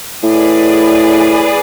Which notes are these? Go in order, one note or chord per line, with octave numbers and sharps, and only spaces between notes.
A2 G#4 B4 D5